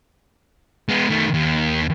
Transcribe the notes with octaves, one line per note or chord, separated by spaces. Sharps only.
G#3 B3
D#3 A3
D#2